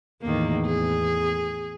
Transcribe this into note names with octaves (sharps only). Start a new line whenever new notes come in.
E2 A2 D#3 A#3
G#4